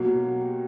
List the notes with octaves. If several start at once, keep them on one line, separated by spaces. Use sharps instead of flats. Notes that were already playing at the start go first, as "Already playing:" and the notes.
Already playing: B2 F#3 A#3 F#4 F#5
G4 G5